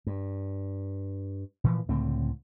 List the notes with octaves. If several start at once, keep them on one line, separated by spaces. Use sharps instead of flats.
G2
A#2 E3 F3
C#2 A2 D3 C4